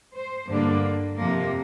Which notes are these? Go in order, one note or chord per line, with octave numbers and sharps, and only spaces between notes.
C5
G2 D3 A#3 D4
F2 C3 F3 A#3